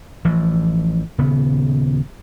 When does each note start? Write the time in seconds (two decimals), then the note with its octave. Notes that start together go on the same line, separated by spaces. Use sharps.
0.25 A1 E3 F3
1.18 D#1 C#3 B3